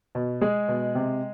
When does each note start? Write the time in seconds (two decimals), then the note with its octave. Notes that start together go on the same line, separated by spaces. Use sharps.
0.15 B2
0.41 G#3 G#4
0.68 B2
0.95 C3